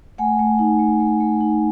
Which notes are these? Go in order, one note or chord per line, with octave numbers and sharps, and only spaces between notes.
A3 F#5 G#5
A3
D#4
A3
A3
A3
D#4